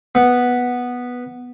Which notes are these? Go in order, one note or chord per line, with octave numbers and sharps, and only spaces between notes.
B3